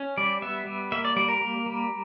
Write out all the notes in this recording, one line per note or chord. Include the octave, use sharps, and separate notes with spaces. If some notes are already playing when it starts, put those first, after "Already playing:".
Already playing: C#4
G3 D5
B3 E5
G3
A#3 E5
D5
G3 D5
A#4
A#3
G3